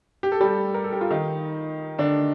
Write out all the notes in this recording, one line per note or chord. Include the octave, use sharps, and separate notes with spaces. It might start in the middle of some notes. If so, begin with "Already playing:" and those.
G4
A4
G3 G4
A#4
A4
G4
F4
D#3 D#4
D3 D4